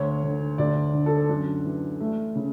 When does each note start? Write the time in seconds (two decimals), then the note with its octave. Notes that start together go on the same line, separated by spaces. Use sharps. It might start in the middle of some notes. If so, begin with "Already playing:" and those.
Already playing: D2 C#5
0.23 D3
0.58 D2 D5
0.94 D3
1.06 A4
1.29 F#2 D4
1.65 E3
2.00 A3
2.35 C#3